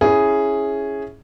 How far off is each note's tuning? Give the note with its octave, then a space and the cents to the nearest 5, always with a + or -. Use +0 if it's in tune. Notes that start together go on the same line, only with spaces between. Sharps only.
C#4 +0 E4 +0 G#4 +0